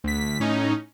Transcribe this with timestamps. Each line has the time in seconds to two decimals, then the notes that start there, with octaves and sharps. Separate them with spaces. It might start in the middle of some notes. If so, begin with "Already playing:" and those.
0.04 D2 B6
0.40 A2 C#4 D#4